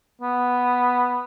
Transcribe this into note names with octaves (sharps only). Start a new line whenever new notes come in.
B3